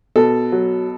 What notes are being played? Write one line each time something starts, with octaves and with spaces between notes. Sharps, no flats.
B2 A4
F#3